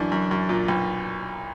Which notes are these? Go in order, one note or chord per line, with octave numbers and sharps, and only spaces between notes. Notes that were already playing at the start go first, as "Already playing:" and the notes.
Already playing: F#2 E3 D4
F#2
F#2
A#2
B1